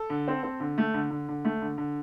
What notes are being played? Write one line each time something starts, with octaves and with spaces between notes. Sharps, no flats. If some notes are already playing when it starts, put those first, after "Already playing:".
Already playing: A4
D3
C4
C4
D3
A3
D3
D3
D3
A3
D3
D3